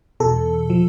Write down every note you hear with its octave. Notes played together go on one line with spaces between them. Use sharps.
E2 B2 A4
F3